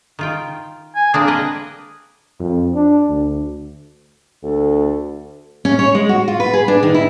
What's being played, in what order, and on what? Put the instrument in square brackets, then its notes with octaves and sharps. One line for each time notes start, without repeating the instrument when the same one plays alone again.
[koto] D#3 F4 G5
[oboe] G#5
[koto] A#3 C4 D4 [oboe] G#4
[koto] A#4 B4 D#5
[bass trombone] F2
D4
D2
[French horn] D2 [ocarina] A4
[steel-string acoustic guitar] C#4
C#5
G#3
F#4
F4
B4
G#4
D4
D#3
E4